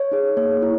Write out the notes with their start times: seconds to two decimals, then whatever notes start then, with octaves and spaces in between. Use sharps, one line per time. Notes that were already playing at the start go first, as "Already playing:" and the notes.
Already playing: C#5
0.12 D#4 G#4
0.37 A#3 C#5
0.63 E4